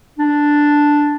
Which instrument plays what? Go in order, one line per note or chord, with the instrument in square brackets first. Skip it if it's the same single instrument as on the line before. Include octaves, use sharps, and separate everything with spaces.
[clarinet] D4